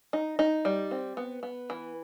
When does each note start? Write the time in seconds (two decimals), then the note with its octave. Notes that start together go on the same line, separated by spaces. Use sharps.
0.13 D#4
0.39 D#4
0.65 G3
0.91 C4
1.17 B3
1.43 B3
1.70 E3